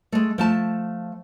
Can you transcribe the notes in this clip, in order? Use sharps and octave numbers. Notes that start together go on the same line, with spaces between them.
G#3 A3
F3 A3 A5